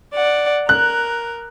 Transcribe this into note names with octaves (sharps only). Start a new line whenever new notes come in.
D5 F#5
A#4 F#6